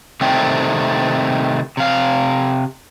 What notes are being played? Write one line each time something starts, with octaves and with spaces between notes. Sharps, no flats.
C3 D#3 G3 A3 C4
C3 F5